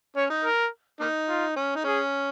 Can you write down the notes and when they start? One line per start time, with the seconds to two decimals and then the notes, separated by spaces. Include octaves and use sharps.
0.16 C#4 C#5
0.30 D#4
0.44 A#4
1.00 A#3 D#4
1.29 F4
1.56 C#4
1.76 D#4
1.84 C#4 G#4